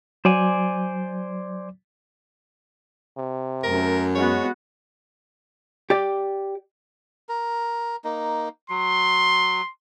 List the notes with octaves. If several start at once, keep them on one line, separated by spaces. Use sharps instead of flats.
F#3 C5 D5 G#5
C3
F#2 A3 A#4
G#3 B3 F#4 C#5
G4 D5
A#4
A#3 D#4
F#3 C6